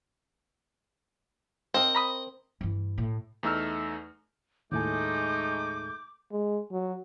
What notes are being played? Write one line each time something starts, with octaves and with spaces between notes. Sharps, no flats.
C4 A#4 D#5
A#5 B5 D#6
G2 E3
A2
E2 A3 D#4 E6 F6
D#2 A2 G#3 A3 D#4 G#5 D6 G6
G#3
F#3